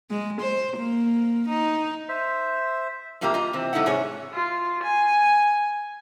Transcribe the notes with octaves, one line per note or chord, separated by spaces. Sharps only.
G#3
C5
A#3
D#4
C5 E5
A2 C3 A#3 F4 G4 A#5
F4 D#5 A#5
C3 E3 C4
G2 C3 A3 D#4 E4 F#5
G#2 C3 G#4 C#5
F4
G#5